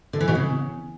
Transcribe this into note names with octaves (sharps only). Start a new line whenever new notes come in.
D3
E3
B2
C#3